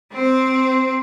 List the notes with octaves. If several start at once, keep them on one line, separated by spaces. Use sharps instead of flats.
C4 C5